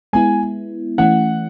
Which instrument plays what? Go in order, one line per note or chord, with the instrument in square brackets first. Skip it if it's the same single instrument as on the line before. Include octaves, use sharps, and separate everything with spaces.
[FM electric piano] G#3 B3 E4 [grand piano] G#5
[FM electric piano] E3 A3 C#4 E4 [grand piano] F#5